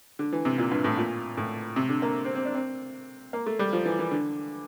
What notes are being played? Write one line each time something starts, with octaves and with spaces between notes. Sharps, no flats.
D3
E3
C3
A#2
G2
A2
A#2
A2
C3
D3
A#3
C4
C4
D4
C4
A#3
A3
G3
F3
E3
E3
D3